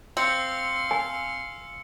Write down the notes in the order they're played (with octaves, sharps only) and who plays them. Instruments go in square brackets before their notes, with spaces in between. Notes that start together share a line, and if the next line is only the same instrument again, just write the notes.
[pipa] C4 [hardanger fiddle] F5 C6 [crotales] E6 C#7 F#7
[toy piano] G#5